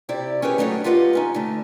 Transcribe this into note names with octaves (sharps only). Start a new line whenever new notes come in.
C3 E4 G4 D5
C#4 G4 G#4 B4 C#5
F#3 A3 D4 D#4 B4 C#5
E4 F4 G4 B4 D#5 F#5
D#3 C#4 D#4
D3 A3